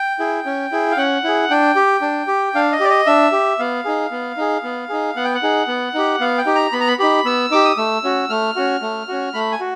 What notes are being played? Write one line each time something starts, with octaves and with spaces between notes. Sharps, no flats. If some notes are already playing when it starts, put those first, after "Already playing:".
Already playing: G5
E4 G#4
C#4
E4 G#4
F5
C#4 F#5
E4 G#4
D4 G5
G4
D4
G4
D4 F5
D#5
G4 D5
D#5
D4 E5
G4
B3 F5
D#4 G#4
B3
D#4 G#4
B3
D#4 G#4
B3 F#5
G5
F#5
D#4 G#4
B3
D#4 G4
B3 F5
G5
D#4 G4
A#5
B3 B5
A#5
B5
D#4 G4 B5
B3 E6
D#4 G4 D6
D#6
A3 E6
C#4 F#4
A3 F6
C#4 F#4
A3
C#4 F#4
A3 B5
G#5
F#4